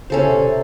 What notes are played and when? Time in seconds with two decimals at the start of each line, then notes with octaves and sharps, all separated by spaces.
0.10 C#3 C#4 A4 C5
0.22 C3
0.34 A#2
0.46 C3